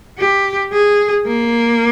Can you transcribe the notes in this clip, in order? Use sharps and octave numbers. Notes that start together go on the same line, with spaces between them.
G4
G#4
A#3